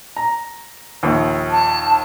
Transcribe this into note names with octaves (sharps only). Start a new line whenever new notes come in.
A#5
A#1 D#2
A5